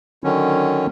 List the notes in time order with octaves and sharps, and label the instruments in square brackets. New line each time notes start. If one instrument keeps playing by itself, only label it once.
[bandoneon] D3 D#3 F#3 C#4